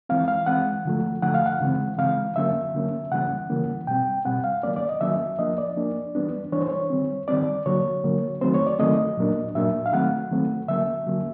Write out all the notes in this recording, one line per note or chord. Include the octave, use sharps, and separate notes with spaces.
E3 G#3 C4 F5
F5
E3 G#3 C4 F#5
D3 F3 A3
D3 F3 A3 F#5
F5
F#5
C#3 E3 G#3 C4
C#3 E3 G#3 C4 F5
D3 F#3 A#3 C#4 E5
D3 F#3 A#3 C#4
C#3 E3 G3 A#3 C#4 F#5
C#3 E3 G3 A#3 C#4
B2 G3 C4 G5
B2 G3 C4 F#5
F5
D#3 F#3 A#3 C#4 D5
D5
D#5
D#3 F#3 A#3 C#4 E5
F3 A#3 D4 D#5
D5
F3 A#3 D4
E3 G3 B3 D4
E3 G3 B3 D4 C#5
C5
C#5
D#3 G3 C4
D#3 G3 C4 D5
D3 F#3 A#3 C#5
D3 F#3 A#3
D#3 F#3 A3 C4 C5
C#5
D5
D#3 F#3 A3 C4 D#5
A#2 F#3 A#3 D4
A#2 F#3 A#3 D4 E5
F5
D#3 F#3 A3 C4 F#5
D#3 F#3 A3 C4
D3 F#3 A#3 C#4 E5
D3 F#3 A#3 C#4